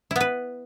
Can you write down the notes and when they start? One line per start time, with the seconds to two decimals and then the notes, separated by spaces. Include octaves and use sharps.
0.11 E4
0.16 B3
0.21 B4